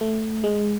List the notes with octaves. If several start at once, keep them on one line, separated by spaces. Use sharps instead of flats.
A3
G#3